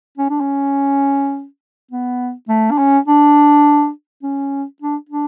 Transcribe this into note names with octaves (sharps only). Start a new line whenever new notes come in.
C#4
D4
C#4
B3
A3
D4
C#4
D4
C#4
D4
D4